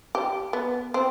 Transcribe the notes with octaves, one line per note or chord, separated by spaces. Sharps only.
G4
B3
C4